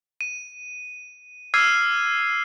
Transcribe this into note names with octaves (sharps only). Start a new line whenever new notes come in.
D#7
D6 E6 F6 G#6 C7 D#7